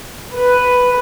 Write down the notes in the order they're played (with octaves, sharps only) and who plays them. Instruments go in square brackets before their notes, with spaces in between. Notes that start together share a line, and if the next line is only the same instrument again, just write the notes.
[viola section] B4